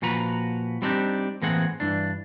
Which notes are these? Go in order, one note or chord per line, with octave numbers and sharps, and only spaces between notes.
A#2 F3 F#4 B4 A#5
G3 C4 D4 D#4 F4 G4
A2 E3 A#3 C4 G#4 F#5
G2 E3 D4